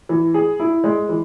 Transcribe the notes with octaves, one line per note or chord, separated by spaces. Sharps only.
E3
G#4
E4
G#3
E3